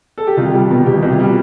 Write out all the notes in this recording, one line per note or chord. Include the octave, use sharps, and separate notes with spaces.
A4
G4
C2 F4
G3
B2
C2 G4
C2
F4
G3